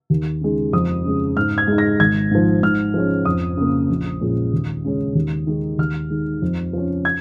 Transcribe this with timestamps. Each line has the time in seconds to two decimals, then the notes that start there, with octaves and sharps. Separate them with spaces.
0.10 D#2
0.41 C#3 G#3 D#4
0.73 F2 D#6
1.05 C#3 G#3
1.37 G#2 F6
1.58 G#6
1.68 G#3 D#4
1.78 A#6
2.00 G#1 G#6
2.31 G#2 F3
2.63 G#2 F6
2.94 F3 G#3 C#4
3.25 F2 D#6
3.57 C#3 A#3
3.90 A#1
4.21 A#2 F3 G#3 C#4
4.53 D#2
4.84 C#3 G#3 C#4
5.15 D#2
5.47 D#3 G#3 D#4
5.78 D#2 F6
6.10 D#3 G#3
6.42 F2
6.73 F3 C#4
7.05 G#6